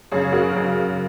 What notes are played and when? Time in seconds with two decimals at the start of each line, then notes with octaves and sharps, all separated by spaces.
0.12 F#2 C#3 G#4 C#5
0.32 F#4 A#4
0.53 F#2 C#3